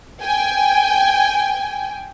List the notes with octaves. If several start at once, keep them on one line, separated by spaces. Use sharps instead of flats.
G5 G#5